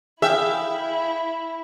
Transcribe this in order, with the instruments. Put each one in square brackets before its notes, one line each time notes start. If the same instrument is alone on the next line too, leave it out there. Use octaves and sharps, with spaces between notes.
[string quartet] E4 [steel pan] G#4 [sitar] E5 [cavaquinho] F5 G5